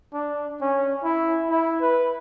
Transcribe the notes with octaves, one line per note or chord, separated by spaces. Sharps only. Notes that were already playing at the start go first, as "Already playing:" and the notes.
D4
C#4
E4
E4
B4